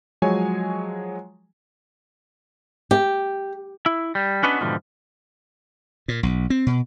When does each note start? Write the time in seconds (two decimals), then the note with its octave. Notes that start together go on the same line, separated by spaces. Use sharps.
0.22 F3 F#3 G#3 C#5 G#5
2.91 G4
3.86 E4
4.15 G3
4.43 B3 C#4 D4 F#4 B4 D#5
4.61 G#2 B2 D3 E3 F3 G3
6.08 A#2
6.23 B1
6.50 C4
6.66 B2